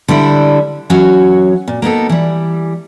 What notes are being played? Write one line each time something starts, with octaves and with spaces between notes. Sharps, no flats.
D3 G3 D4 E4
E3 F#3 C#4 F#4 C#5
A#2
A#3 B3 D#4 A4
E3 G3